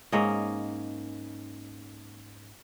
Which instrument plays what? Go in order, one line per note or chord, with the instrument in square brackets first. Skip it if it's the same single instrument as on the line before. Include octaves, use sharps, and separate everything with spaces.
[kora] G#2 A#3 C#4 D#5